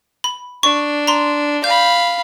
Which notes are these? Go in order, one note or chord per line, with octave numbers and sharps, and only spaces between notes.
B5
D4 C#6
A#5 C6
F5 B5 G6